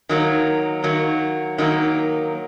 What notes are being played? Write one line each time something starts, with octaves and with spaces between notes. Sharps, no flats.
D#3 F#3 A#3
D#3 F#3 A#3
D#3 F#3 A#3